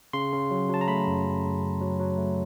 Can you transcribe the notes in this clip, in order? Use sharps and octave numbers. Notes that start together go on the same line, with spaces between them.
C#3 C6
C#3
F#3
F#3 A5
A#5
A3 B5
F#2
F#2
C#3
C#3
F#3
F#3
A3